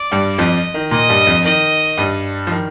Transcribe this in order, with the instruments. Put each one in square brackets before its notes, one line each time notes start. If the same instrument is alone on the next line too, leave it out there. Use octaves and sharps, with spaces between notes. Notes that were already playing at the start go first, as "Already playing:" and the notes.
Already playing: [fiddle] D5
[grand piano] G2 G3
[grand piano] F2 F3 [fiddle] D#5
[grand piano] D#3
[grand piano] A#2 A#3 [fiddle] D#5
[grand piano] G2 G3
F2 F3
[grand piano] D#3 [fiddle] D#5
[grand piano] G2 G3
F3
D#3